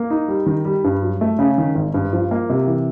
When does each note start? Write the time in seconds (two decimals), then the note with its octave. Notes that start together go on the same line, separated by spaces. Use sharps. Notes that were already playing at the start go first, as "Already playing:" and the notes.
Already playing: A#3
0.10 D#4
0.28 G3
0.46 D#3
0.65 G3
0.84 G2
1.02 F#3
1.21 A3
1.39 C#3
1.58 D#3
1.75 G#1
1.94 G2
2.13 F3
2.31 A#3
2.50 C3
2.67 E3